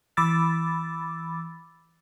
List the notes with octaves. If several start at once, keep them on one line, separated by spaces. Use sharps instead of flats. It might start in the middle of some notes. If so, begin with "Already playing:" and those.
E3 B5 D6 E6 A6